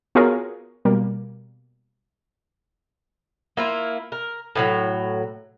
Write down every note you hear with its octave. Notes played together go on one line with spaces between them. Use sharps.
B3 F4 F#4 G#4 A#4 C#5
B2 G3 A#3
A#3 E4 F4
A#4
A2 E3 F#3